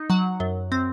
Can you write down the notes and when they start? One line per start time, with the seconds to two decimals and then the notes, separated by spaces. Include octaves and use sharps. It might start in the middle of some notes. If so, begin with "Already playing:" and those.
Already playing: D#4
0.10 F#3 F#5
0.40 F#2
0.72 C4